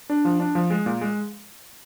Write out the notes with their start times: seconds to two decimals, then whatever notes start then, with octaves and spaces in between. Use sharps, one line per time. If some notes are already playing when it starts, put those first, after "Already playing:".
0.10 D4
0.25 F3
0.40 D4
0.55 F3
0.70 G#3
0.86 A#2
1.01 G#3